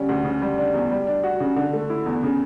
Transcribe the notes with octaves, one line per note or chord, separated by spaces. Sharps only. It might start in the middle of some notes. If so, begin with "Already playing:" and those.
Already playing: D3 G3 C#4
D2
C#3
G3
D4
E2
G3
D4
F#4
C#3
D3
A3
E4
E2
C#3